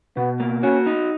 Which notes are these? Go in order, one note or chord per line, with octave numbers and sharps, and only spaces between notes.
B2 B3
A#3
C#4 F#4
D#4